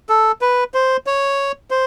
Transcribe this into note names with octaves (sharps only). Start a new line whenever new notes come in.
A4
B4
C5
C#5
C5